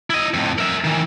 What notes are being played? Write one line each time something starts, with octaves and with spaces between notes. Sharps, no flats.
E4 D#5
F2 A2
A#4 E5
D#3 E3